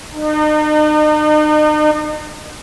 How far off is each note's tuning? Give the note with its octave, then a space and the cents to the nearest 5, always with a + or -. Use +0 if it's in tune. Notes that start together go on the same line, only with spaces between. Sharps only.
D#4 -40